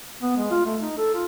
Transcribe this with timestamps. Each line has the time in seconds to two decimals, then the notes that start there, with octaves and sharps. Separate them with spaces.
0.22 B3
0.37 G#3
0.51 F4
0.65 A3
0.81 D#4
0.98 A4
1.14 F4